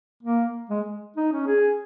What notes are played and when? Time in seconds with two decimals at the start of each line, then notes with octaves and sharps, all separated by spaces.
0.23 A#3
0.70 G#3
1.16 D#4
1.32 C#4
1.47 G#4